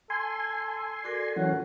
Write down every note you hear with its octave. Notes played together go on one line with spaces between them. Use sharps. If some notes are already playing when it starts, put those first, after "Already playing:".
A4 G#5 C6
F#4 A4 A#4 D5
E3 F#3 C#4 F#5